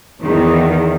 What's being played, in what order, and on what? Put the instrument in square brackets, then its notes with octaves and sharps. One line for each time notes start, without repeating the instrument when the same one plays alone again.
[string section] E2 [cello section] D#3